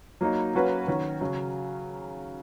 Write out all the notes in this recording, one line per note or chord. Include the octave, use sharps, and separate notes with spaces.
F#3 A#3 D#4
F#3 A#3 C#4 F#4 B4
D#3 F#3 C#4 F#4
C#3 F#3